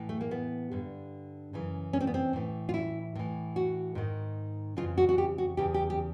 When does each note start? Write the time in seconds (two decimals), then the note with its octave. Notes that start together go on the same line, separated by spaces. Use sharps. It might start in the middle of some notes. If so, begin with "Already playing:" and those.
Already playing: A2 E3
0.09 A3
0.21 A#3
0.31 B3
0.72 G2 D3
1.53 F#2 C#3 E3
1.93 C#4
2.01 C4
2.07 B3
2.14 C4
2.33 A2 E3
2.69 F4
2.74 E4
3.15 A2 E3
3.56 F#4
3.95 G#2 D#3
4.77 F2 C#3 E3 F4
4.98 F#4
5.09 F#4
5.18 G4
5.38 F#4
5.57 E2 C#3 E3 G4
5.74 G4
5.90 G4